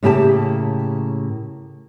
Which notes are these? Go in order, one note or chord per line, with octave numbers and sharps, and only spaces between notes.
A2 C#3 A#3 G4 G#5 A5